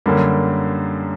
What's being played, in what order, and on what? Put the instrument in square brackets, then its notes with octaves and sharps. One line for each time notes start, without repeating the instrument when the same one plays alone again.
[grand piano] F#2 D3 G3 A#3